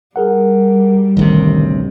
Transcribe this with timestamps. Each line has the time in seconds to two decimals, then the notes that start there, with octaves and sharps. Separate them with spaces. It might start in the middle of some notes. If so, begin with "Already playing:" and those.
0.16 G3 G#4 A#4 F#5
1.17 A1 D2 C3 D#3